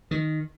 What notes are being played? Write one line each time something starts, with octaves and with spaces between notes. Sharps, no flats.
D#3